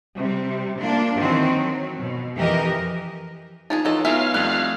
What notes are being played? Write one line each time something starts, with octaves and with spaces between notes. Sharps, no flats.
C3 G3
A#3 D4 F4
D#3 E3 C4 F#4
F#3
B2
F2 E3 G4 A#4 D#5
F3 D4 D#4 G#4
E3 F#3 F4 A4 D#5
F#3 B3 F4 E5 F5 G#5 F6
F2 G3 A3 F#6